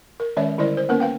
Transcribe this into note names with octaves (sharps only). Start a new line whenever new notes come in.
A#4
D#3 G#3 C#4 C#5 D5 E5
D3 G3 E4 A#4 C5 D5
C5
A#3 B3 C#4 A#4 B4
B4 F5 G5